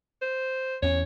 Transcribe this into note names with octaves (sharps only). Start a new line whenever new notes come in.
C5
E2 C#4 C#5